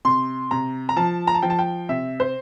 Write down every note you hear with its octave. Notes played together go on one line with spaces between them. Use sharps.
C3 C6
C3 A#5
A#5
F3 A5
A#5
A5
F3 G5
A5
G5
C3 E5
C5